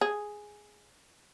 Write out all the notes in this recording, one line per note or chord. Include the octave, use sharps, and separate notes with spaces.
G#4